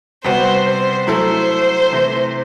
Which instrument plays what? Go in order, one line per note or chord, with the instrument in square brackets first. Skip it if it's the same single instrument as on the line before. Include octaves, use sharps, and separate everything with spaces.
[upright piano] C3 G3 B3 F#4 [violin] C5
[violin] C5
[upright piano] F#3 A3 E4 A4 [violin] C5
[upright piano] C3 E3 A3